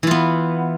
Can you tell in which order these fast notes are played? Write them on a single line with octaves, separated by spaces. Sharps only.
E3 F4 B3